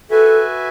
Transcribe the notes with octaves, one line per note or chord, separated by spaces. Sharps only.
F#4 A4 B4 E5 G#5